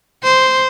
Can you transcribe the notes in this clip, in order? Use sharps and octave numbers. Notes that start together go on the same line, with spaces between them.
C5